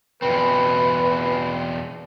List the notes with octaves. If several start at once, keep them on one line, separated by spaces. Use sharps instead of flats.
E2 B2 C4 B4